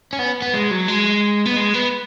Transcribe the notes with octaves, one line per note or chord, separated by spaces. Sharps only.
C#4
B3
B3
G#3
F#3
G#3
B3
G#3
B3